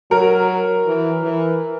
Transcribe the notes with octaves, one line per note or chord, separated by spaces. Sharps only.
F#3 A#4
E3
E3